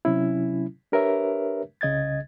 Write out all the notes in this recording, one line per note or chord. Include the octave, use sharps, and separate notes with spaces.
C3 F#3 C#4 E4
D4 G4 A#4 B4 C#5 E5
C2 C#3 D#5 G#6 A6